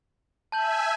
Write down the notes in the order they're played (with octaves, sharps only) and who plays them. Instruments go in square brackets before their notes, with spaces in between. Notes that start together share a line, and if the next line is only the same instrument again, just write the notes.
[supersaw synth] E5 G#5 [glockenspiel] A5 G6 F#7